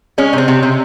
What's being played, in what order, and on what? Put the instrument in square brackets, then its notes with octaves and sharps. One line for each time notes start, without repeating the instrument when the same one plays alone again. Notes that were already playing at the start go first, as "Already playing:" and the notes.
[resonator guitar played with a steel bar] G#3 C#4
C3
C4
C3
C3